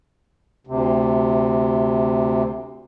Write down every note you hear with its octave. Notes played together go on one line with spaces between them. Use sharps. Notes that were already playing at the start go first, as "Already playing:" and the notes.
D2 C3